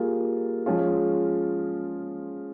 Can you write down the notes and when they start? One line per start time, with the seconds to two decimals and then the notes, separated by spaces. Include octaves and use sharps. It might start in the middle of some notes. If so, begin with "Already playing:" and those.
Already playing: G3 A#3 F4 G#4
0.66 F3 G#3 C#4 F4 G#4